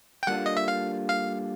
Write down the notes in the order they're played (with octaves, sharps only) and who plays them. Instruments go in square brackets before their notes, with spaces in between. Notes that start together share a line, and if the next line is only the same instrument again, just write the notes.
[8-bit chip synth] G5
[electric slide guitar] G3 A#3 D4 F4 A4 [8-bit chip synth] F#5
[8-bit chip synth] D#5
E5
F5
F5